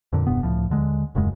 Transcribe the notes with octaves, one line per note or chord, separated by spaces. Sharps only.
F2 A#2 D3
E1 G2 C3 B3
C#2 A2 F3
D#2 D3 G#3
D#1 F#2 C#3 G#3